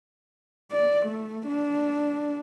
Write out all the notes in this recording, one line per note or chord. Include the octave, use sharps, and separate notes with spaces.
D5
A3
D4